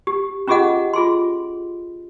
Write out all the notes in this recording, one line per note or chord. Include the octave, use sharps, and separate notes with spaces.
G4
C#4 F4 G4 G#4 D#5 F#5
F4 G#4 C6